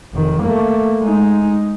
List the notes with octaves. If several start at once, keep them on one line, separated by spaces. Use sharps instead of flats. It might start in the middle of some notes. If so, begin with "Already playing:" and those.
F1 D#3
A3 A#3
G#3 D#4